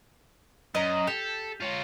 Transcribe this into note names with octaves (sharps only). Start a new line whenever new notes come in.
F#2 D#5 A#5
G4 A4
F4 C#5